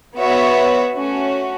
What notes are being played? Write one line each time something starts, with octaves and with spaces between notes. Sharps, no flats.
B3 F#4 C#5 E5
A3 C#4 F#4